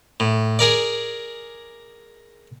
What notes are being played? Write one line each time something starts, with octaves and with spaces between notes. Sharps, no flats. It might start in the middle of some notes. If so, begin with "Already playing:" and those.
A2
G#4 A#4 D5